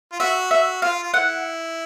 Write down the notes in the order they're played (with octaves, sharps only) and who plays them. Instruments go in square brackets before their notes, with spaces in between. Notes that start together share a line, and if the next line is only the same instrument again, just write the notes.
[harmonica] F4
[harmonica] F#4 [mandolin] E5
[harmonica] F#4 [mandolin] E5
[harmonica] F4 [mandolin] F5
[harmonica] F4
[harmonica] E4 [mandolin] F#5